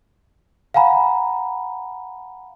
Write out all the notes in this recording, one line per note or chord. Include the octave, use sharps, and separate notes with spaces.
F5 F#5 G#5 A#5 B5